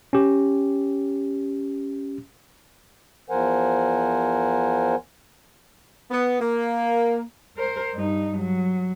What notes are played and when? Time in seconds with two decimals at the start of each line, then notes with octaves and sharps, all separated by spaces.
0.13 C#4 G4
3.30 E2 F3 A#4 C5 F#5 G#5
6.11 B3
6.40 A#3
7.57 A#4 C5
7.94 G2 D#4
8.38 F#3